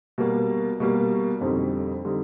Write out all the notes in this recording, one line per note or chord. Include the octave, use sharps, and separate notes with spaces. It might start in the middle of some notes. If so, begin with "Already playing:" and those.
B2 G3 A#3
B2 G3 A#3
F2 D3 G3 C4 D#4
D3 G3 C4 D#4